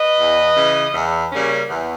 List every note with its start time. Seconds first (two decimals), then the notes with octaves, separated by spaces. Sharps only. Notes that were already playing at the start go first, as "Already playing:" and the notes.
Already playing: B4 D#5
0.18 E2
0.56 C#3 E3
0.94 E2
1.32 C#3 G3 A#3 C#4
1.69 E2